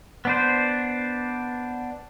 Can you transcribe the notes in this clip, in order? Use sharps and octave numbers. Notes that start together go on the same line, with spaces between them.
B3 D4 C5